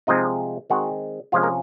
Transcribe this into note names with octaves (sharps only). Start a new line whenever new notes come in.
C3 F3 G#3 C4 D#4 D#5
D#3 G#3 C4 F#4 F#5
C3 F3 G#3 C#4 F4 F5
A#3 A#4